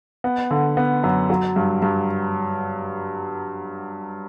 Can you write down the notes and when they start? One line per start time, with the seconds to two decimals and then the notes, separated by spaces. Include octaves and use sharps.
0.24 B3
0.51 D3
0.77 B3
1.04 F#2
1.30 F#3
1.56 G2
1.82 G2